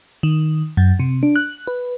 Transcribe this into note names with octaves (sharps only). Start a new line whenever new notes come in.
D#3
F#2
C3
D4
F#6
B4